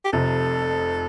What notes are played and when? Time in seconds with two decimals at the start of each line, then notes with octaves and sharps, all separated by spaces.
0.05 G4
0.13 F1 F2 C3 A4